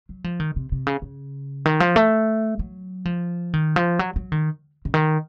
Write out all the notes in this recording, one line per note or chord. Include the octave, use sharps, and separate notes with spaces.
F#3
F3
D#3
C3
C3
C#3
C#3
D#3
F3
A3
F#3
F3
D#3
F3
F#3
F#3
D#3
C#3
D#3